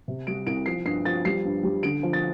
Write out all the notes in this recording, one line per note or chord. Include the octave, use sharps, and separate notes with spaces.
C3
G3 D7
C2 D7
F3 C7
G2 C7
F3 A6
G3 C7
G2
G3
D3 D7
F3
A6